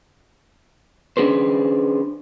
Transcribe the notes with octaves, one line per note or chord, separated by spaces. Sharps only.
C#4 D4 G#4 B4 C5